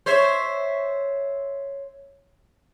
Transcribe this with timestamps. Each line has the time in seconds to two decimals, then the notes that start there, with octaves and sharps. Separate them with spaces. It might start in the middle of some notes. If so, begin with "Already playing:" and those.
0.06 C5 C#5 E5